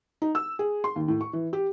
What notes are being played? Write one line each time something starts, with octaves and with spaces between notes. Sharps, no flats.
D#4
E6
G#4
C6
D#2
A2
C#6
E3
G4